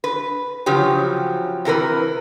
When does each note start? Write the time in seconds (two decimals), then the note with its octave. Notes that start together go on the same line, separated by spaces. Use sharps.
0.04 B4
0.66 C#3 F3 F#3 G4
1.65 C3 E3 A#4 B4